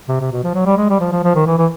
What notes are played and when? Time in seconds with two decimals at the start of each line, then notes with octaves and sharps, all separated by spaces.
0.08 C3
0.20 C3
0.31 B2
0.43 F3
0.54 F#3
0.66 G3
0.77 G#3
0.89 G3
1.00 F3
1.12 F3
1.24 F3
1.35 D#3
1.46 E3
1.58 E3